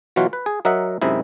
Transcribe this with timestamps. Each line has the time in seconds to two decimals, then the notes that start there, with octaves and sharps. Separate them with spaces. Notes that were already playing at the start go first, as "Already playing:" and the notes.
0.16 B2 E3 F#3 F4 F#4
0.33 B4
0.46 G#4
0.65 F#3 A#4 D#5 E5 F#5
1.02 F#2 C3 G#3 D#4 E4